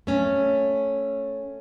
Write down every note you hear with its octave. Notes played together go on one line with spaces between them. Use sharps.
A3 C#4